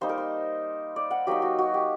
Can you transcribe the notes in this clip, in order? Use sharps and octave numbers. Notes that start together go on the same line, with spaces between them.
G3 A#3 D#4 C5
A#4
C5
D5
F#5
F#3 A#3 D#4 G4
F#4
F#4
G4